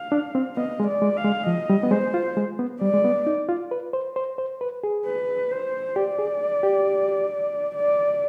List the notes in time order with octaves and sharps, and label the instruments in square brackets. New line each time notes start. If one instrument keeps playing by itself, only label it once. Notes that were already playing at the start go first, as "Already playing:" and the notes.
Already playing: [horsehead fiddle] F5
[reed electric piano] D4
C4
[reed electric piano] B3 [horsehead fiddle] D#5
[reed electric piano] G#3
[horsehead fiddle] D5
[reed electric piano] G#3
[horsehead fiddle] F5
[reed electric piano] G#3
[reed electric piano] F3 [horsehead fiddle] D#5
[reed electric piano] G3
B3
[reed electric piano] G#3 [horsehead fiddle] C5
[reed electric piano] F4
G#3
B3
[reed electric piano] G3 [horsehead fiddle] D5
[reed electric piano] G#3
B3
D#4
F4
B4
C5
C5
C5
B4
G#4
[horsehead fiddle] B4
C5
[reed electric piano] G4 [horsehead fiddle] D5
[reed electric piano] G#4
G4
[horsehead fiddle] D5